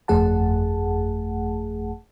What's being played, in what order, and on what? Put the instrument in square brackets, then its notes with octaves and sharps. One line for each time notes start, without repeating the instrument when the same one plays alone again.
[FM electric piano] G1 F2 A3 G#4 F#5 A5